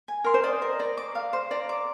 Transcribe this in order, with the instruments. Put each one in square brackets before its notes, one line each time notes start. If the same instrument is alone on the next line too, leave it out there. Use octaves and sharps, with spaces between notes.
[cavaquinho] G#5
[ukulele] A#4 [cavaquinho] C6
[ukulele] C5
[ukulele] D5 [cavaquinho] D#5
[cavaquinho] A#4
[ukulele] D5 [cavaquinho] A#5
[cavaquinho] D6
F5
C5
[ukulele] D5 [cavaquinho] A#5
[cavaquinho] D6